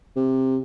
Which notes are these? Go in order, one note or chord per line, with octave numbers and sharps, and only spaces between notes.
C3